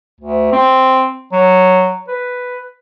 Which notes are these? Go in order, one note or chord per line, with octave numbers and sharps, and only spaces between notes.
D2
C4
F#3
B4